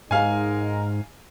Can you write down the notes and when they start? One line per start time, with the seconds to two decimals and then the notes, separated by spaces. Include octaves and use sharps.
0.11 G#2 G#3 D#4 A#4 F5 G#5